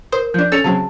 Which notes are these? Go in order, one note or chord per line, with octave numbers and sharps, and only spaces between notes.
A#4 C5 D#6
F3 D4 G6
C#4 A4 E6 A6 C#7 F7
C#3 F#3 C4 A5